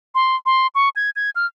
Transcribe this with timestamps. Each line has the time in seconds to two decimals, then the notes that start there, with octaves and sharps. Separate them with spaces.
0.15 C6
0.46 C6
0.75 C#6
0.96 G#6
1.16 G#6
1.36 F6